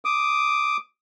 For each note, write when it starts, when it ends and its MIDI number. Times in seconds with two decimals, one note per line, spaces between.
0.05 0.77 86
0.05 0.77 87